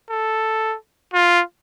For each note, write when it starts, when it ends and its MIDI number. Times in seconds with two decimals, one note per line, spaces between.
0.11 0.76 69
1.14 1.42 65